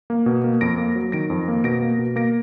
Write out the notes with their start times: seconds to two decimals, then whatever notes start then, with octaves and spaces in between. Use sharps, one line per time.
0.10 A#3
0.26 B2
0.44 A#3
0.61 F2 A#6 D7
0.78 A#3
0.95 F#3
1.12 D#3 A#6 D7
1.30 F2
1.48 A#3
1.64 B2 A#6 D7
1.82 A#3
1.99 B2
2.16 A#3 A#6 D7